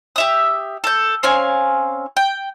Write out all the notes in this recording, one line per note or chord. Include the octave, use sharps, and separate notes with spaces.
G4 E5 D#6
A4 G6
C4 C#4 F5 G#5
G5